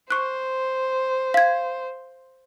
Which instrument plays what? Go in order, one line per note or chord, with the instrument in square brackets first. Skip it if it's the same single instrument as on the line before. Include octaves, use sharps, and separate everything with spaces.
[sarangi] C5 [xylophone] C#6 F#6
[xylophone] F5 G#6